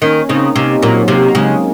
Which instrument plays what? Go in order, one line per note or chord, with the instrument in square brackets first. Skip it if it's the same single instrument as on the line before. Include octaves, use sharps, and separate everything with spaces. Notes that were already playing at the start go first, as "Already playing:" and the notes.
[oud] D#3 [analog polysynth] A#3 C#4
[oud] C#3 [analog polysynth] C4 D#4
[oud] C3 [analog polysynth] A#3 C#4
[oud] A#2 [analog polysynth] F#3 A#3
[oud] C3 [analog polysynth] F#3 A#3
[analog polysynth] A#3
[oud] C#3 [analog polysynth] G#3